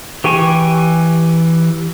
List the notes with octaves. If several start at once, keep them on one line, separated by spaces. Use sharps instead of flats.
E3 G4 G5 G#5 C#6